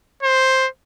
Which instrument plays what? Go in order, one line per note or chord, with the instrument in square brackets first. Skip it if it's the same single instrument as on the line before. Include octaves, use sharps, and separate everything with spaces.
[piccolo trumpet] C5